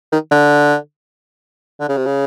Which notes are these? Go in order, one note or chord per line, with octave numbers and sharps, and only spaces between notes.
D#3
D3
D3
C#3
C3
C#3